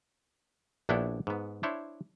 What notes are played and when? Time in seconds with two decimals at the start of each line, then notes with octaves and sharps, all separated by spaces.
0.89 A#1 B3 D4 E4 C#5 G5
1.27 G#2 B3
1.63 D4 E4 C5 C#5